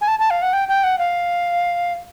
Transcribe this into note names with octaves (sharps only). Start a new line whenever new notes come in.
G#5
A5
A5
F5
F#5
G5
G5
F#5
F5